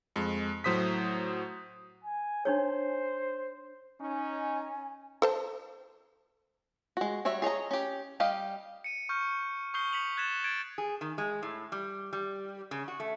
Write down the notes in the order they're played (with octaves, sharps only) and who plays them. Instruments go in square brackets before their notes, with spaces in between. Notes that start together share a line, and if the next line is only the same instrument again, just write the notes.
[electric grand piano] F2 G#3
A2 F#3 C5 D#6 B6
[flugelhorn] G#5
[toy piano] D4 D#4 C#5 [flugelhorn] C5
[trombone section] C#4 D#4 [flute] G#5
[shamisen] A4 C5 A5
[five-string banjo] G#3 F#4
G3 F#4 C#5 E5
G#4 C#5 D#5 A#5
C#4 G4
G3 G4 D#5 F5
[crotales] C#7 D#7
C#6 F6 G6
C#6 D#6 G6 C7 G7
B6 C#7 F7 F#7
F#6 G#6 A6 B6 E7
G#6 A6 D7
[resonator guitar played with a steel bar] G#4
D#3
G#3
A2
G3
G3
C#3
F#4
A3